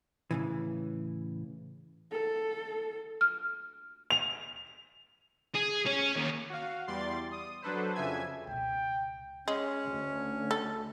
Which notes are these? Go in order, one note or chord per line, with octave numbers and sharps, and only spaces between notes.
A2 C#3 E3
A4
F6
F7
G#4
C#4
D#2
F#4 F5
E2 G3 D5 C6 A6
D#6
F#3 D4 A4 B4 C5
F2 C#3 E5 G#5 G#6
C#2 B2 G5
G#3 C#4
D2
A4